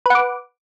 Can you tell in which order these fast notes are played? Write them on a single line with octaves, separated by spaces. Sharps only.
B4 F#5 D6